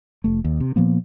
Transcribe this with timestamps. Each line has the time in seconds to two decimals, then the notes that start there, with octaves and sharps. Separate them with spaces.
0.24 F1 A3
0.44 D#2
0.60 C3
0.76 A#2 F3 A#3 B3